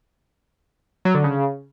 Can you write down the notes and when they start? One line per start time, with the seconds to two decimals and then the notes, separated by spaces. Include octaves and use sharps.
1.05 F#3
1.15 D3
1.24 C#3